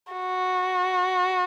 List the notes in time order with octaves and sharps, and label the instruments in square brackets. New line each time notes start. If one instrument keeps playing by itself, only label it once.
[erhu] F#4